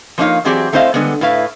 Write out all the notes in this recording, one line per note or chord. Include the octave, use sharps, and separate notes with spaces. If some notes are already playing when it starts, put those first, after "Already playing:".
F3 A#3 D4 D#4 C#5 F5
E3 F#3 C4 G4 G#4 D5
A3 C4 E4 C5 D#5 F5
D3 G3 G#3 B3
A2 E4 B4 F5